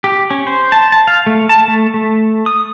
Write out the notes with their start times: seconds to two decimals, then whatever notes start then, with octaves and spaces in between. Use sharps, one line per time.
0.04 G4
0.31 C#4
0.47 C5
0.72 A5
0.92 A5
1.07 F5
1.27 A3
1.49 A5
1.68 A3
1.94 A3
2.46 D#6